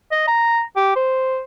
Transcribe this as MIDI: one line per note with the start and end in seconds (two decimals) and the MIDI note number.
0.12 0.26 75
0.28 0.62 82
0.76 0.94 67
0.96 1.41 72